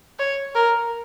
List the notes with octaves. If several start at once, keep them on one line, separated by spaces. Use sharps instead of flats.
C#5
A#4